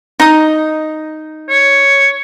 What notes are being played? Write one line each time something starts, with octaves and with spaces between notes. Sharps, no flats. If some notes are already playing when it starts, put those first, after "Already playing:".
D#4 D#6
C#5